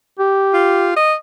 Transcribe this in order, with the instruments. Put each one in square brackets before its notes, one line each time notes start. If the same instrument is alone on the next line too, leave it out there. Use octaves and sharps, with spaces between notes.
[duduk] G4
[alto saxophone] F4
D#5